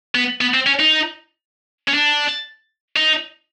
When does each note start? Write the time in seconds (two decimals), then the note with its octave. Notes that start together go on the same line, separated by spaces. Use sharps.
0.15 B3
0.41 B3
0.54 C4
0.67 C#4
0.79 D#4
1.88 C#4
1.94 D4
2.96 D#4